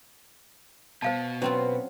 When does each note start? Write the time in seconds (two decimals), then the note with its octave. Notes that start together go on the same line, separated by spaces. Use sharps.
1.02 B2 C5 F5 A5
1.42 F#3 C4 C#4 F4 B4